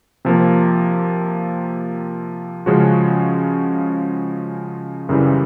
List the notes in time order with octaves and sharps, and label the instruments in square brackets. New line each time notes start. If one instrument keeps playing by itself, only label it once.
[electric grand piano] C3 F3 A#3
C#3 F3 G#3 C#4 F#4
F#2 C#3 E3 G3